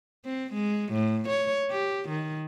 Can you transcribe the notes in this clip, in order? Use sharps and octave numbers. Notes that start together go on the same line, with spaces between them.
C4
G#3
A2
C#5
G4
D#3